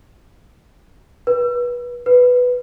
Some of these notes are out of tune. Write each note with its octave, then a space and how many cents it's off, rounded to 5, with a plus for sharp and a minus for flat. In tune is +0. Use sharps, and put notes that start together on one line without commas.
B4 -25
B4 +5